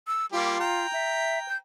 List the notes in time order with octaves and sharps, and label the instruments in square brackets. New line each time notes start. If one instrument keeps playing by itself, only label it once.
[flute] E6
[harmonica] G3 A#3 G4 [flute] F4
[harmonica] G5 A#5
[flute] E5
G6